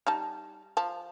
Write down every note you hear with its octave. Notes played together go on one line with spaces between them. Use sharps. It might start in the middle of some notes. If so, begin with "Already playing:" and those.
G3 D#4 A5
F3 A5